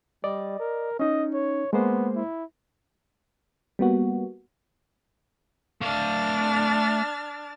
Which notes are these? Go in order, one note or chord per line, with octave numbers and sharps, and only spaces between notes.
G3 D5 D#5
A#4
C#4 D#4 D#5
C#5
G#3 A#3 B3 C5
E4
G3 A#3 B3 F#4
A3 D4 F5 F6 A6